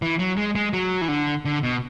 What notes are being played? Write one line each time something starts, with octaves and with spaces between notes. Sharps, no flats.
E3
F#3
G#3
G#3
F#3
E3
D3
D3
B2